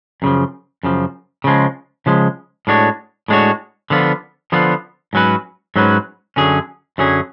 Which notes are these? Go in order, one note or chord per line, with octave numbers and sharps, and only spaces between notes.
F#2 C#3 F3
F#2 C#3 F3
C#3 F3 G#3
C#3 F3 G#3
A2 G#3 D4 F#4 C#5
A2 G#3 D4 F#4 C#5
D3 F3 B3 F4
D3 F3 B3 F4
G#2 F#3 C#4 F#4 B4
G#2 F#3 C#4 F#4 B4
F#2 D3 F#3 C#4 G#4
F#2 D3 F#3 C#4 G#4